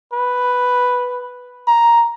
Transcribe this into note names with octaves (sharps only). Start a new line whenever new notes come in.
B4
A#5